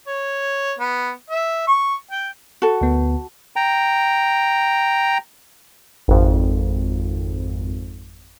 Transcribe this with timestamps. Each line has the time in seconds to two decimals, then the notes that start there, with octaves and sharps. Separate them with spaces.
0.07 C#5
0.79 B3
1.31 E5
1.67 C#6
2.11 G5
2.62 F#4 A4
2.81 D2 B3
3.56 G5 A#5
6.08 G#1 F2